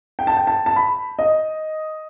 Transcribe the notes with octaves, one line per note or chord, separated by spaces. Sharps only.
G5
A5
G5
A5
A5
B5
D#5